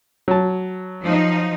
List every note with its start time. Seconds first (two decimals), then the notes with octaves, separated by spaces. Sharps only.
0.28 F#3 A5
1.03 F3 D#4